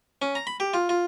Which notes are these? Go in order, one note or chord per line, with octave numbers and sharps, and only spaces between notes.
C#4
A#5
B5
G4
F4
F4